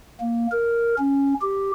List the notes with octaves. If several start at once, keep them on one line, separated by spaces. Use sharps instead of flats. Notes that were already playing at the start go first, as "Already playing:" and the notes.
A#3
A#4
C#4
G4